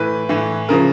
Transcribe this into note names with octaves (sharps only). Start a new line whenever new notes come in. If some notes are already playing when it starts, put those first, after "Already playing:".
Already playing: A2 E3 B4
A2 E3
C#3 F3 A#4